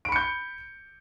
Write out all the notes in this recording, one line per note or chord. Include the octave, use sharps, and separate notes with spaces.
B5 G6 C#7 D7